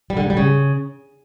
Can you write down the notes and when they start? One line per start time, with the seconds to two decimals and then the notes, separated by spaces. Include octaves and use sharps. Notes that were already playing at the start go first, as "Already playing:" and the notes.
0.10 G3
0.17 D3
0.23 G#2
0.30 G3
0.37 C#3